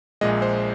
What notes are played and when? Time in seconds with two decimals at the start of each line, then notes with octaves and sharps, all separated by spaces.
0.21 A#1 A#2 G#3 D#5
0.42 C5